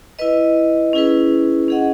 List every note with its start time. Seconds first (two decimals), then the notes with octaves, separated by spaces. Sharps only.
0.19 E4 B4 D#5
0.93 C#4 E4 G#4 B4
1.68 C#4 G#4 D#5 F#5